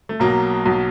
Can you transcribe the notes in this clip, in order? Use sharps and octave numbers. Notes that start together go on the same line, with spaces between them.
A3
B1 B2 F#3 A#3
B1 B2 F#3